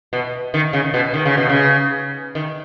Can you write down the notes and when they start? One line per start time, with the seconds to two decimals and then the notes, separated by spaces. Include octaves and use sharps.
0.13 B2
0.54 D#3
0.73 C#3
0.94 B2
1.14 D#3
1.25 C#3
1.37 B2
1.49 C#3
2.35 D#3